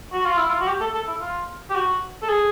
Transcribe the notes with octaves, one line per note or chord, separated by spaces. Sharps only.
F#4
F4
E4
F4
F#4
G4
A4
A4
E4
F4
G4
F#4
A4
G#4